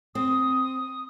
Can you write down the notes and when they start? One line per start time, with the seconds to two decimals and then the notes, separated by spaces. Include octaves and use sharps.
0.15 C4 D#6